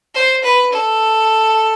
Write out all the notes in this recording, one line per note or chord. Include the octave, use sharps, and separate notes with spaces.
C5
B4
A4